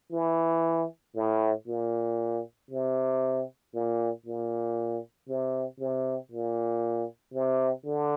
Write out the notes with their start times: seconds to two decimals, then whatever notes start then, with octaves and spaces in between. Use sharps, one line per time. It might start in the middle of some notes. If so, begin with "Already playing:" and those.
0.12 E3
1.16 A2
1.67 A#2
2.71 C3
3.74 A#2
4.26 A#2
5.28 C3
5.80 C3
6.31 A#2
7.34 C3
7.86 D3